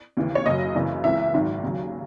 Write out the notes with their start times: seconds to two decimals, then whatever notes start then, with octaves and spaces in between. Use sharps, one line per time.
0.17 D#2 C#3 E3
0.35 C#5
0.46 F#1 F#2 C#3 F#3 D#5
0.75 F#1 F#2 C#3 E3
1.04 C#2 C#3 E3 E5
1.33 G#1 G#2 D#3 F#3
1.63 D#2 C#3 F#3